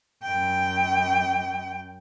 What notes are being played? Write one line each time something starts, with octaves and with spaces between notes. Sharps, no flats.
F#2 G5